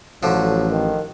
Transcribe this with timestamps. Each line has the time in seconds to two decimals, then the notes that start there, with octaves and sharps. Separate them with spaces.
0.23 A1 D3 F3 F#3
0.71 D#3